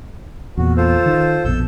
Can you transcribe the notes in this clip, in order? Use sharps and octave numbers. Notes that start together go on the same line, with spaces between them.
E2 A#2 F#4
F4 A4 C5
D#3
A#1 F2 B2 A4 E6 G6